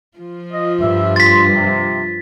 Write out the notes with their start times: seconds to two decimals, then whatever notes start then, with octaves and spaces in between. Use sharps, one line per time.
0.18 F3 F4
0.51 D#5
0.80 G2 E5
1.16 C6 A6 B6
1.54 C3